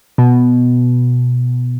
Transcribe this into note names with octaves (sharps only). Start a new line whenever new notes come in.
B2